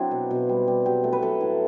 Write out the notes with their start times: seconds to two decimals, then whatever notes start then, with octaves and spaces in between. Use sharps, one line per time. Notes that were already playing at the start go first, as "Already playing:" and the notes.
Already playing: F#3 C4 D4 E4
0.11 B2
0.31 B2
0.49 G3
0.68 G3
0.85 F#3 G4
1.04 A3
1.13 B4
1.22 F#3 A4
1.40 A2